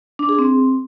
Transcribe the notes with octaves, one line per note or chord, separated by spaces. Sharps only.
D4
G#4
C4